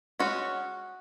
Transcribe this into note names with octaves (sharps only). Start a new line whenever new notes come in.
G#3 C#4 F#4